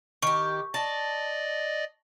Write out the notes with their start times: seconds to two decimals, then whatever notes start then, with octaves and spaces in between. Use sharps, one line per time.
0.23 D#3 G4 C#6
0.74 D5 D#5 A5